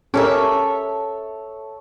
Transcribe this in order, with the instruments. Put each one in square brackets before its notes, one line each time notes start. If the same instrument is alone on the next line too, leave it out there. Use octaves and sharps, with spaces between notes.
[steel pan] C#4 G4 A#4 [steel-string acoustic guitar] A4 C#5 E5